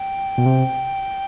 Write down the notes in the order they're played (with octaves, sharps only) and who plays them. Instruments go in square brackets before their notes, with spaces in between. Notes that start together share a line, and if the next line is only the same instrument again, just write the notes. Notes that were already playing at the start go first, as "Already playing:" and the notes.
Already playing: [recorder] G5
[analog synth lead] B2
C3